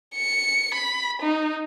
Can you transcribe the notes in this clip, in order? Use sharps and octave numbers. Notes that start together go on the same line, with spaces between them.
C#7
B5
D#4